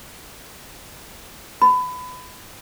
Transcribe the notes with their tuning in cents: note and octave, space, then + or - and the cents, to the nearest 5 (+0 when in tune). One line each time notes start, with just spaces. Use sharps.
B5 +25